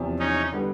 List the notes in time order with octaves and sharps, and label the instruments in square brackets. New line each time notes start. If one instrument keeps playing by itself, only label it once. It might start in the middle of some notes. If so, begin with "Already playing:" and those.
Already playing: [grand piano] E2 C3 F3
[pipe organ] C#4 D#4
[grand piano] D3 G3 B3